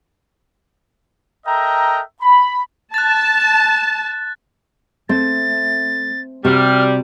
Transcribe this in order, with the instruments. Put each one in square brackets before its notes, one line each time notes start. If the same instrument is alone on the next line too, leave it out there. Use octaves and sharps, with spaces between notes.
[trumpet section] A4 A#4 D#5 E5 G5 A#5
B5
[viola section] A5 [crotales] F#6 A6
[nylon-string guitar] A3 [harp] C4 [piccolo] A6
[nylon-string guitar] C3 [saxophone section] G3 [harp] F#4 [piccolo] F6